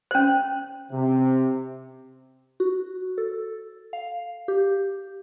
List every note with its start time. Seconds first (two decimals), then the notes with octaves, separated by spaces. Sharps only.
0.11 C#4 C5
0.91 C3
2.60 F#4
3.18 A4
3.93 F5
4.48 G4